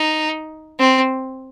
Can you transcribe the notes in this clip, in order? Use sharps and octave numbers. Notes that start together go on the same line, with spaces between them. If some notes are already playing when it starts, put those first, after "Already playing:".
Already playing: D#4
C4